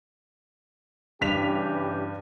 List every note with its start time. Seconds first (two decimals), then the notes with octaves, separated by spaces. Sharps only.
1.21 G2 C#3 E3 G4 B6 F7